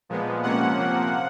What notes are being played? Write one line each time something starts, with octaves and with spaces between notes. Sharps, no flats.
A#2 F3 G#3 B3
C3 F3 A#3 C#4 F#5
C3 F3 A#3